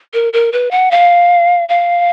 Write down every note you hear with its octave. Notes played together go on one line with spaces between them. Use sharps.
A#4
A#4
B4
F#5
F5
F5